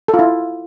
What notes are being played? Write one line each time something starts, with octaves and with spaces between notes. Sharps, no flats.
A4
F4
E4